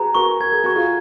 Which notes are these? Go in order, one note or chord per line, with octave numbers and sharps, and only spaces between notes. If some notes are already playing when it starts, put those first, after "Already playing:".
Already playing: F#4 G#4 B4 A#5
F#4 A#4 C#6
A#4 G#6
G#4
F#4 C#6
F4 G#4